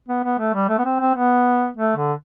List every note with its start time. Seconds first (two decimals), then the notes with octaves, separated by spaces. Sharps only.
0.09 B3
0.24 B3
0.39 A3
0.54 G3
0.69 A3
0.78 B3
0.85 C4
1.00 C4
1.14 B3
1.77 A3
1.96 D3